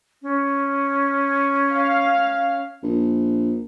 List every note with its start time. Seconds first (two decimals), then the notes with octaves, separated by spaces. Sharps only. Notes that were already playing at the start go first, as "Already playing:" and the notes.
0.22 C#4
1.71 F5
2.83 A#1